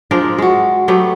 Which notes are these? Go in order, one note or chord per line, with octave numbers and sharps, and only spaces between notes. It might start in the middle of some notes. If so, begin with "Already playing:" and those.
F3 G#3 D4 A#4
G#3 F#4
F#3 A3 B3 G4